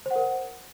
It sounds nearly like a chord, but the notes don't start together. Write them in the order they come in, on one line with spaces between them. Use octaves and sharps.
C5 F#5 A#4